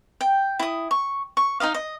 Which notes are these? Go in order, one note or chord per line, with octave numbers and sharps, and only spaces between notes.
G5
E4 D#6
C#6
C#6
D#4 E4 D#5 F5
D#5